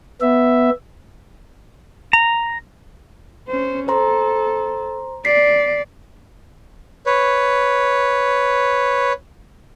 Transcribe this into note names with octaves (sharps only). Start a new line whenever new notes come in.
B3 E5
A#5
C#4 C5
A4 C5 A#5 C6
D5 B6 C7
B4 C#5